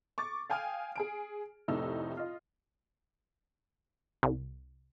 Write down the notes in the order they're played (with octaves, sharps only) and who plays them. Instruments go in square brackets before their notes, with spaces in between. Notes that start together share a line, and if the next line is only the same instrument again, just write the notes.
[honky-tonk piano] C#6 D6 A6
F5 G5 G#5 D#6 F6
G#4 G#5 D7
F1 A2 C3 A3 D#4 E6
F4 D#5
[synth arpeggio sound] C2